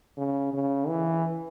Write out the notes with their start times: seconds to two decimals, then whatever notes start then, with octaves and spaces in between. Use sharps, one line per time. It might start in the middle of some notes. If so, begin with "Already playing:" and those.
0.18 C#3
0.53 C#3
0.88 E3